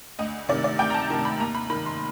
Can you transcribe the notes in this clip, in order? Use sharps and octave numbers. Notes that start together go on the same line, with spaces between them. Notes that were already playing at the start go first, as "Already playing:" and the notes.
D2 D#5
C3 D#3 D5
D5
D2 G5
A#5
A5
C3 D#3
B5
D#2 A#5
B5
D#3 B5
C6